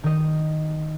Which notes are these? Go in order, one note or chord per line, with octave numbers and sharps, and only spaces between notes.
D#3 D#5